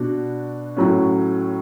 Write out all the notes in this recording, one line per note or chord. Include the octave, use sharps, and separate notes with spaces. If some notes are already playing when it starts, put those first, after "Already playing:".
Already playing: B2 D4 F#4
A2 F#3 C#4